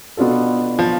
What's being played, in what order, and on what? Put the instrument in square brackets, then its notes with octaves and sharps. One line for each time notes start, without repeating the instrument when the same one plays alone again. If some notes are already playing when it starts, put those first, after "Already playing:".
[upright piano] B2 B3 D4 F4 A4
[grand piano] F3